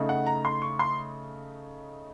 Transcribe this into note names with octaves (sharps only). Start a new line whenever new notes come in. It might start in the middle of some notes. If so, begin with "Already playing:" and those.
Already playing: C#3 A3 D#4
F#5
A#5
C6
C#6
C6